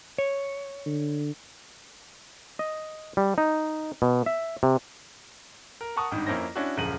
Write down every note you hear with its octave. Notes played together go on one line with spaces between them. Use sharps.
C#5
D3
D#5
G3
D#4
B2
E5
C3
A#4
A#4 F#5 A5 C#6 D#6
G#1 G2 D#3
F2 A#3 C#4 E4 C5 A#6
C#4 D4 E4 F#4
D#1 F#2 C#3 F3 D#7 F#7